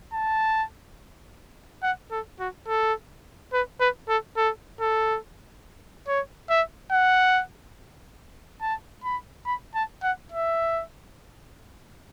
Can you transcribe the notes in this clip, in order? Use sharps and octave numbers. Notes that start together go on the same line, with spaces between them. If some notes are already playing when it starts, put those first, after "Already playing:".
A5
F#5
A4
F#4
A4
B4
B4
A4
A4
A4
C#5
E5
F#5
A5
B5
B5
A5
F#5
E5